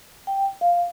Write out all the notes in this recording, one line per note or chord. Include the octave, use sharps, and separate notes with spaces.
G5
F5